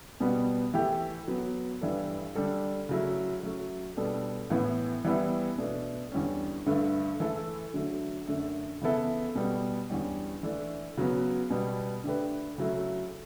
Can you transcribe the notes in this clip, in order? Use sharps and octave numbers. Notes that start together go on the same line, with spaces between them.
B2 G3 B3
E3 A3 E4 G4
F#3 B3 F#4
G2 E3 G3 D4 A4
D3 G3 D4 A4
C#3 F#3 A3 E4
F#3 A3 C#4
B2 G3 D4 A4
A2 E3 B3
E3 G3 B3 E4
B2 A3 D4
E2 D3 G3 C#4
G2 D3 A3
E3 A3 E4 A4
D3 F#3 A3
F#2 D3 A3
C#3 E3 B3 E4 A4
B2 G3 B3
E2 D3 G3 C#4
E3 A3 D4
C#3 F#3 B3
B2 G3 B3
D3 A3 D4 G4 B4
C#3 F#3 A3 E4